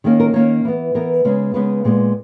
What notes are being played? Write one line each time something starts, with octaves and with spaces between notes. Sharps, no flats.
D#3 A#3 C#4 G#4
A#4
D#3 A#3 C#4 C#5
E3 B3
E3 B3 A#4
C#3 G#3 B3
C#3 G#3 B3 B4
A#2 G#3 B3